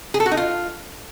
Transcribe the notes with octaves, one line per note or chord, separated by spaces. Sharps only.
G#4
A4
F#4
D#4
F4